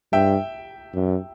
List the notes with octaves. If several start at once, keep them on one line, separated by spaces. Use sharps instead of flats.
G2 E5 G5
F#2